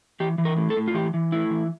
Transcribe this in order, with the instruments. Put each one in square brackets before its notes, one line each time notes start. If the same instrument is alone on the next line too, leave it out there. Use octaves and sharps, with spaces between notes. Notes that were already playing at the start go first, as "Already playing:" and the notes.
[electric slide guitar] E3 G4
E3
A#4
A2
A4
A2
F4
E3 G4
E3
A2 E4
E3